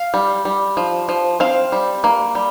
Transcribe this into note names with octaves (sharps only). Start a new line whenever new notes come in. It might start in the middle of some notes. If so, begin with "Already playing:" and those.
Already playing: F5
G3
G3
F3
F3
C4 F5
G3
A#3
G3